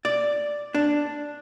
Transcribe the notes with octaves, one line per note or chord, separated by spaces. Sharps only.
D5
D4